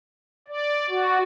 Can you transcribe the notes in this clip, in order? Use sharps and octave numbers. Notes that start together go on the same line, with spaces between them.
D5
F#4